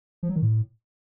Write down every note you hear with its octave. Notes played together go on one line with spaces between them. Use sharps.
F3
F#3
D#3
A2